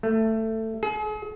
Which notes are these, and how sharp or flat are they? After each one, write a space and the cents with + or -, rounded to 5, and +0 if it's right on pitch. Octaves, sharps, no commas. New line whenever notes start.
A3 +15
G#4 +40